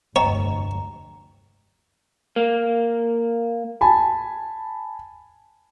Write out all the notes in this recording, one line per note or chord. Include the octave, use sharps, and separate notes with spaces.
F1 D2 G2 C#5 D#5 G5 A#5
A#3
G#5 A5 B5